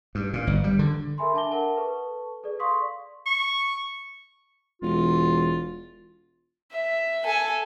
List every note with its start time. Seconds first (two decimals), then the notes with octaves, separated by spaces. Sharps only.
0.15 G2
0.33 A#2
0.47 G1
0.64 G3
0.79 D3
1.18 A4 A#4 E5 G#5 B5 C6
1.34 D4 E5 A5 D6 A#6 G7
1.52 A#4 E5 F#5 A5
1.77 A4 B4 A5 C#6
2.43 G#4 A4 B4 D5
2.59 D5 F5 C6 C#6 D#6 B6
3.26 C#6
4.82 E1 F4
6.71 E5
7.25 A4 G#5